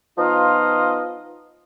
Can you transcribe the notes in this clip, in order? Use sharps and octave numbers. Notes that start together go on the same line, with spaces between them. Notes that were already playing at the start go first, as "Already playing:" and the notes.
F3 B3 D#4 F4 D#5 F5